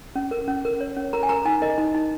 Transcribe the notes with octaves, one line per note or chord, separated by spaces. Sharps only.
C#4
A#4
C#4
A#4
C#5
C#4
A#4 A#5
G#5
A#4 A#5
D#4 G#5
A#4 D#5
D#4
D#4